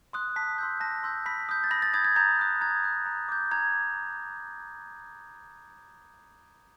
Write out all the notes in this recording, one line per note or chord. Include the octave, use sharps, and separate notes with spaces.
C6 D#6 F#6
A5 B6
C6 E6 G6
A5 A#6
C6 E6 G6
B5 B6
D#6 G6
A6
B5 A#6
A6
D#6 G6 G#6
G#6
A#5 G6
D#6 F#6
A#5 G#6
D#6 F#6
A#5
D6 G6
A#5 G#6